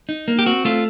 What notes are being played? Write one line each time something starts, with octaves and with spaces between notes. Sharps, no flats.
D#4
A#3
G4
C4 F#4
A3 F4